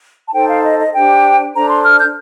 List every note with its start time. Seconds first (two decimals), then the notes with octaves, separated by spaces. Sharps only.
0.28 A5
0.34 D#4 A4 C5 G5
0.49 F5
0.63 D#5
0.78 D#5
0.94 D4 G4 C5 G5
1.54 D4 A4 C5 A#5
1.69 C6
1.84 F6
1.99 G6